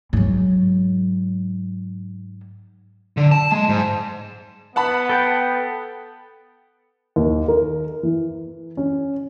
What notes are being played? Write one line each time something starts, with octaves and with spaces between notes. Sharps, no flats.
G#2 F#3
D3
A5
G#3
G#2
B3 F#5 A5 B5
A4 G5 G6
D#2
A#4
E3
C#4